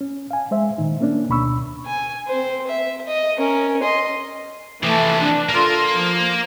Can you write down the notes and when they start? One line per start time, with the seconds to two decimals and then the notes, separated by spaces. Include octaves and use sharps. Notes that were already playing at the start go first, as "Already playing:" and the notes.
0.01 C#4
0.31 F5 G#5
0.51 G#3 C5 E5
0.78 A#2 D#3 D#4
1.01 A#3 C#4 D4
1.28 D2 B2 D4 B5 C#6 E6
1.86 G#5
2.27 C4 C5
2.68 E5
3.08 D#5
3.38 C#4 A#4
3.82 D#5 C6
4.83 C3 E3 F3 A3 A5
5.17 D4
5.49 A#3 F4 A4
5.94 F3